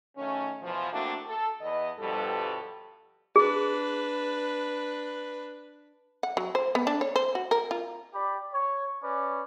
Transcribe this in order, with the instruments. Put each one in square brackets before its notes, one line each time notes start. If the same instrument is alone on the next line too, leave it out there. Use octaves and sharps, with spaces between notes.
[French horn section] D#3 F#3 A3 C#4
E2 B2 E3 F3
A3 A#3 C4 D4 E4 F#4
A4
E2 B3 D#5
G2 B2 F3 G3 A4
[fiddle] D4 B4 [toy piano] G#4
[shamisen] F#5
F#3
C5
B3
D4
C#5
C5
F#4
A#4
F4
[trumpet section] G4 D5 B5 D6
C#5
C#4 B4 D5